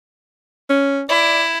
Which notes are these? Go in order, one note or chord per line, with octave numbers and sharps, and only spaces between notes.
C#4
E4 D5